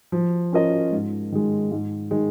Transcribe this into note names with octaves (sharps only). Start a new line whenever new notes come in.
F3
C#4 F4 A#4 D#5
G#2
D#3 G#3
G#2
D#3 G#3